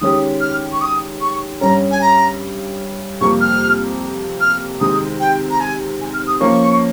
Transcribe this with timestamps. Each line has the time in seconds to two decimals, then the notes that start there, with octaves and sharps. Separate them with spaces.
0.01 D#3 G#3 C#4 G4 D#6
0.41 F6
0.73 C#6
0.81 D#6
1.21 C#6
1.61 G2 G3 C#4 A#5
1.91 G#5
2.01 A#5
3.21 F2 C3 G3 A#3 C#6
3.41 F6
4.41 F6
4.81 C3 D#3 G#3 D#4 D#6
5.20 G5
5.50 A#5
5.60 G#5
6.01 G#5
6.14 F6
6.27 D#6
6.40 F3 A#3 C#4 C#6